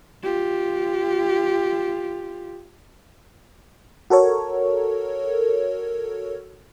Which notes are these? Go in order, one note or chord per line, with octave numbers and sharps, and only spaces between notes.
F4 G4
F#4 A4 A#4 C#5